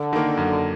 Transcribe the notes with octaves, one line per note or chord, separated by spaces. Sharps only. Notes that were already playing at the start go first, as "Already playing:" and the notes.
Already playing: D3
D#3 A#3
F#2